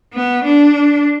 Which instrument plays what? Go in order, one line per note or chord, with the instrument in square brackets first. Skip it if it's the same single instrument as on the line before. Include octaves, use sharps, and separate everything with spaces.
[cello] B3
D4